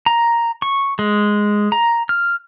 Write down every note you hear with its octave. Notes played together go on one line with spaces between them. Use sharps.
A#5
C#6
G#3
A#5
F6